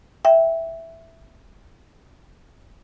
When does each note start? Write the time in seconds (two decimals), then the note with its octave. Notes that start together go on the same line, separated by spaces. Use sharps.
0.25 E5 G5